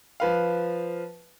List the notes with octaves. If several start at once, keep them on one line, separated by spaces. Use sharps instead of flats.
F3 B4 F5